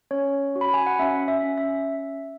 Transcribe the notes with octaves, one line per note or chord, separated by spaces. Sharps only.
C#4 C#5
F#4
B5
G#5
F#5
C#4 E5
E5
C#4
E5